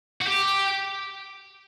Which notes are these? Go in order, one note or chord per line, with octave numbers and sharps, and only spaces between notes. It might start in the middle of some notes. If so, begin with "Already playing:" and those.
F#4
G4